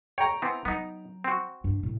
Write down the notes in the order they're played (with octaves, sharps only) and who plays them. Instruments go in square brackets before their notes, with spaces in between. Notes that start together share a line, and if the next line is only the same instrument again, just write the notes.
[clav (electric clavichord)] C#5 [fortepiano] G5 A#5
[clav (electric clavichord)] E3 B3 C4
[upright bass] F#3 [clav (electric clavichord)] B3 D#4
[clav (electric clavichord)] C4 F#4
[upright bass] G2 D4
A2